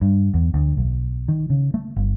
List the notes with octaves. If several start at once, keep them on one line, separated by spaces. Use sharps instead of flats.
G2
E2
D2
B1
D#3
C#3
A3
G1